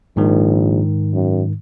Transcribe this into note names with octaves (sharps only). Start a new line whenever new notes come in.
A#1 G#2 D#3
F#2